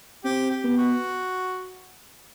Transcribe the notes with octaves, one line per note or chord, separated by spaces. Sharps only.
C4 G4
G4
B3
F#4